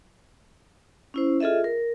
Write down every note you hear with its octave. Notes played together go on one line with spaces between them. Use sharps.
C#4 E4 C5
F4 G#4 A4 D#5 E5
A#4